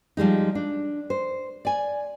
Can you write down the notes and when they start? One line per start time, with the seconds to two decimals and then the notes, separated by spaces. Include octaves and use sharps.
0.17 F3 G3 G#3 D#4
0.55 D4
1.10 C5
1.65 D5 G#5